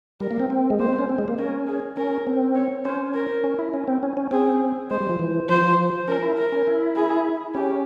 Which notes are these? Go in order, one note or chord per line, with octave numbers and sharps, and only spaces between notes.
G3 A#4
A#3
C4
C4
G#3
A#3 C5
C4
C#4
C4
G#3
A#3
C#4 A#4
G#4
C#4 A#4
C4
C#5
C#4 C5
A#4
C#4
E4
C#4
C4
C#4
C#4
C4 G#4
G#3 C5
G3
F3
E3
F3 C5
C#4 A#4
E4
A#4
C#4
E4
G#4
C#4 G4